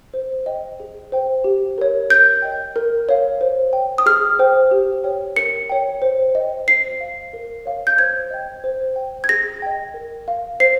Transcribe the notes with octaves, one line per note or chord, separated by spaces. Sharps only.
C5
D#5 G5
G#4
C5 G5
G4
A#4 C#5
A#4 G6
D#5 G5
A#4
C#5 F5
C5
G5
D#6
G#4 F6
C5 G5
G4
C#5 G5
A#4 C#7
C#5 G5
C5
D#5 G5
C5 C7
F5
A#4
C#5 F5
G6
C5 G#6
D#5 G5
C5
G5
G#6
G#4 A#6
D#5 G5
A#4
F5
C5 C7